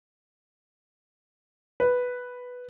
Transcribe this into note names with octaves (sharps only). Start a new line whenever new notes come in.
B4